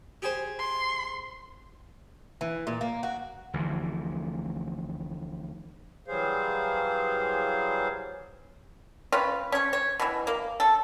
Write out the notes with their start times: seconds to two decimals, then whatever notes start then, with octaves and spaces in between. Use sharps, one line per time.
0.22 G4 G#4 C5
0.59 C6
2.41 E3
2.67 A#2
2.81 A#3
3.03 F#4
3.54 D2 E3 F3
6.08 E3 F#3 G3 G#4 C5 F5
9.12 C4 C#4 F4 B4
9.52 C#4 C#5
9.73 C#5
10.00 B2 E3
10.27 A#3
10.60 A4